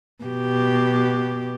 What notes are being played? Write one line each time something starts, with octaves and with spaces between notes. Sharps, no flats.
B2 G4